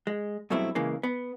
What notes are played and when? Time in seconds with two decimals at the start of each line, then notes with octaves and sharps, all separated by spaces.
0.07 G#3
0.50 G2 B2 F#3 A3 C4 E4
0.75 C#3 E3 G#3 A#3
1.03 B3